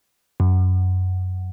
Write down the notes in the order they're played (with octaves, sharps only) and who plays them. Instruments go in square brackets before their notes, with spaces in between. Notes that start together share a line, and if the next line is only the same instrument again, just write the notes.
[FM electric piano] F#2